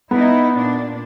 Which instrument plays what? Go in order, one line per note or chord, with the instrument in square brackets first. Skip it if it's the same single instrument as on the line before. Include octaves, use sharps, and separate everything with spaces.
[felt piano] B3 [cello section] D#4 E4
[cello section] A#2 D4